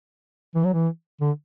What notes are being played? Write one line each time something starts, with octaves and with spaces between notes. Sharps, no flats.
E3
F#3
E3
D3